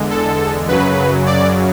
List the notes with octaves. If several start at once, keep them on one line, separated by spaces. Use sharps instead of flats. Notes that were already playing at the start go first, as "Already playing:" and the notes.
Already playing: E2 D3 G#3
A4
F#2 C#3 F#3 B4
D5